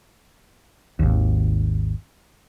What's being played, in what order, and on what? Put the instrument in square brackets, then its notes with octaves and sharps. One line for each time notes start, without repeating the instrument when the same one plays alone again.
[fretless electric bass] G#1 D#2